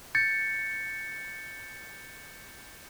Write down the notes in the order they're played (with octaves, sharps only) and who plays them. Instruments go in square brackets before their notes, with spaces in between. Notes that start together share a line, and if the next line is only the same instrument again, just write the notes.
[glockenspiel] G6 A6 C#7